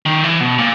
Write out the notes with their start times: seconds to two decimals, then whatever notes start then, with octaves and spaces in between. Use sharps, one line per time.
0.06 D#3
0.24 E3
0.41 B2
0.58 A#2